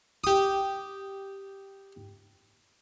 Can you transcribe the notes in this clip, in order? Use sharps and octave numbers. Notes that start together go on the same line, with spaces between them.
G4 D#6